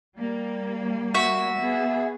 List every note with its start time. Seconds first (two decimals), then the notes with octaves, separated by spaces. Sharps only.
0.16 G3 A#3
1.15 F#4 E5
1.56 B3 G#4